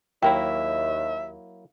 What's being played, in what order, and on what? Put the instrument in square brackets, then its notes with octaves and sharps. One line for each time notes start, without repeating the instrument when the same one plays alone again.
[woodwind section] D#2 [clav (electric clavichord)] F#3 A#3 E4 [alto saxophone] E5 [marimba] G5